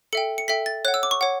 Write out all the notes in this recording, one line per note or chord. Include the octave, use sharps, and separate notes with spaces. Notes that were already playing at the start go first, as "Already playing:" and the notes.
A4 E5 G5 C#7
C#7
A4 E5 G5 B6
A6
C#5 F#5 F#6
E6
D6
C#6
C#5 F#5